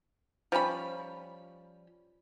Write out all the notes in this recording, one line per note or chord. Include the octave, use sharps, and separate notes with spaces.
F3 G3 C#4 B5